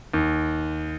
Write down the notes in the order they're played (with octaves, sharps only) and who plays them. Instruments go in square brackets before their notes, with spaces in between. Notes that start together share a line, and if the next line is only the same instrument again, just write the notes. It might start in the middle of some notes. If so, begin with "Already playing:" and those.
[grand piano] D#2